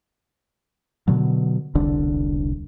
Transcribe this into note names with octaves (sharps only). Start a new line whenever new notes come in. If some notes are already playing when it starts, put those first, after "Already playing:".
B2 D3 F#3
E1 C2 D3 D4